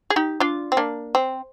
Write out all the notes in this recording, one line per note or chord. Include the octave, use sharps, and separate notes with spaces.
G#4
D#4 G4
D4 F4
C4
A#3 D4
C4